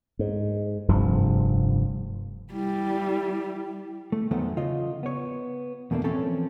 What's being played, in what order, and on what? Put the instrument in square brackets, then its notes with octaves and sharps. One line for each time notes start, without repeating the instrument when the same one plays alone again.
[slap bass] G#2
F1 G2 C3 F3
[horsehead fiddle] G3 [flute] E4
[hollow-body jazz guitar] A3
E2 D#3 F#3 A3 B3 C5
C#3 F4 D#5
B3 C#5
E2 B2 A3 A#3 D4
E3 F3 C4 C#4 A4 C#5